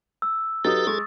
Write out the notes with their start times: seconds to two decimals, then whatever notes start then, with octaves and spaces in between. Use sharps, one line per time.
0.22 E6
0.65 F#3 D#4 G4 A4 B4 D#6 A6
0.87 G#3 G#4 A4 C#6